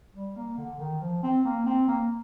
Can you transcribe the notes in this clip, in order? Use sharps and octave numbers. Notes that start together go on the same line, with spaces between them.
G3
A#3
D3
D#3
F3
C4
A#3
C4
A#3